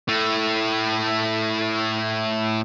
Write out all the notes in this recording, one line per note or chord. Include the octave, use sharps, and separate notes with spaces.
A2 A3